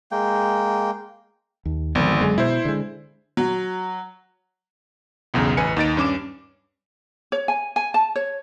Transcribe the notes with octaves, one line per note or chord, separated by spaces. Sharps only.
G#3 A#3 G5
D#2
G#1 D3 F3 B3
F#2 D3 F#3 G#3
B2 E4 C5
D3 G#3
F#3
B1 E2 C#3
A1 B4 G#5 C#7
D#2 D#4 A6 D7
G2 C#4 D6 E7
C#5
G#5
G#5
A5
C#5